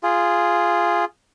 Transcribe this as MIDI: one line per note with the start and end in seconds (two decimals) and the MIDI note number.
0.03 1.05 65
0.03 1.05 68